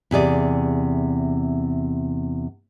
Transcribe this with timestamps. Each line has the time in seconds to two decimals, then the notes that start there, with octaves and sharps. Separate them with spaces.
0.11 E2 C3 G#4 D5